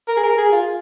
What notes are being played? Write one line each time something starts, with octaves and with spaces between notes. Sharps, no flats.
A#4
G#4
A#4
G#4
F4